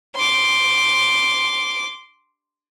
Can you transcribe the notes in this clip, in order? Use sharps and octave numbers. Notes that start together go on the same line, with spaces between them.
C6 D6